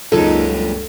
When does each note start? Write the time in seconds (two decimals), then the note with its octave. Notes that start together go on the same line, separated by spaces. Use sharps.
0.12 C#2 F#2 A#2 D#4 A4
0.48 G2 A#2 G3